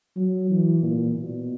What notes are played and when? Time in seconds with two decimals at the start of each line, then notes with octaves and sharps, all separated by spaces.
0.16 F#3
0.51 E3
0.83 A#2
1.16 B2